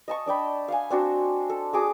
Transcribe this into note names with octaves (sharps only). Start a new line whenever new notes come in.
D#5 A5 C#6
D4 D5 G5 B5
F5 F#5 G#5
C4 D4 F#4 C5
A4
F#4 G#4 D6 D#6